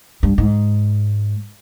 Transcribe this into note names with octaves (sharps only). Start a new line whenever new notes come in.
G2
G#2